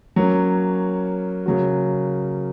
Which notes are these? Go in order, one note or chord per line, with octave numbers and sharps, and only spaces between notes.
F#3 A#3 C#4
C#3 F#3 A#3 F#4